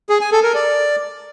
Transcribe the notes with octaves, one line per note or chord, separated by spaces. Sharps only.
G#4
G#5
A4
A#4
D5